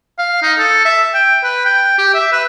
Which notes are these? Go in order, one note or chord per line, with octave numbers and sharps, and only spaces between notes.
F5
D#4
A4
E5
G5
B4
G5
G4
E5
B4